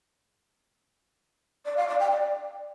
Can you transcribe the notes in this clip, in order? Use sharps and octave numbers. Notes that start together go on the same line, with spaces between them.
D5
F5
D5
G5
D5